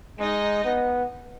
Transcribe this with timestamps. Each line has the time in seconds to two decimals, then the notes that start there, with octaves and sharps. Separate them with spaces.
0.19 G#3 D#4 D#5
0.65 B3